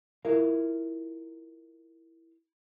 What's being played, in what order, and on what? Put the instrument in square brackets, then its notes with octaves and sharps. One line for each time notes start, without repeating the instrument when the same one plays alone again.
[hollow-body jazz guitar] E4 F4 A#4 F5